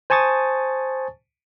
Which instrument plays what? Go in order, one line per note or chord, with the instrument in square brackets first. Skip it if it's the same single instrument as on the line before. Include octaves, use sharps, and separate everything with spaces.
[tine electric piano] C5 G#5 A5 C#6 D#6 A6